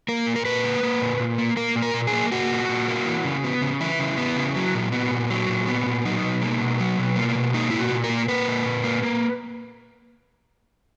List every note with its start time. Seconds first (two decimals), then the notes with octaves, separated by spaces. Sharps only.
0.08 A#3 A#4
0.26 A#2
0.36 A#4
0.45 A#2 B4
0.64 A#3
0.83 A#3
1.01 A#2
1.20 A#2
1.38 A#3
1.57 A#3 A#4
1.76 A#2
1.82 A#4
1.94 A#2
2.07 G#4
2.13 A#3
2.32 A#3 F#4
2.51 A#2
2.69 A#2
2.88 A#3
3.06 E3
3.24 C#3
3.44 B3
3.62 C#3
3.80 E3 E4
3.99 C#3
4.18 B3
4.37 C#3
4.56 F#3
4.75 A#2
4.92 B3
5.11 A#2
5.30 F#3
5.49 A#2
5.68 B3
5.86 A#2
6.05 F#3 D#4
6.23 B2
6.42 A#3
6.61 B2
6.80 F#3
6.99 B2
7.16 A#3
7.35 B2
7.54 A#3 D#4
7.70 A#2 E4
7.78 F#4
7.91 A#2
8.04 A#4
8.10 A#3
8.28 A#3 B4
8.48 A#2
8.65 A#2
8.84 A#3
9.03 A#3